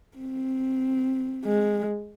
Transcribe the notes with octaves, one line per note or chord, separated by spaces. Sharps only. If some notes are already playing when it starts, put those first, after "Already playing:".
C4
G#3